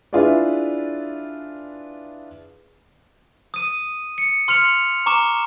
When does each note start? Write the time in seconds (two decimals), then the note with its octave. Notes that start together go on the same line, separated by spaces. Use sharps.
0.13 D4 E4 F4 G#4 B4 D5
3.54 D#6 D#7
4.18 C#7
4.48 C6 F6 C#7 F7
5.06 A#5 C#6 D6 E7